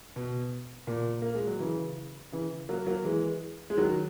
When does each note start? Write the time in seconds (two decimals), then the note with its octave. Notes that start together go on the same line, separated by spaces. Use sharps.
0.16 B2
0.87 A#2
1.22 A#3
1.35 G#3
1.47 F#3
1.60 C#3 E3
2.32 C#3 E3
2.69 F#3 A#3
2.86 F#3 A#3
3.04 E3 G#3
3.70 G#3
3.78 D#3 F#3